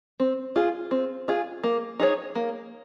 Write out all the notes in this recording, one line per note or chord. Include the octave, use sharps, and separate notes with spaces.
C4
F4 G#4
C4
F4 G#4
A#3
D#4 G#4 C#5
A#3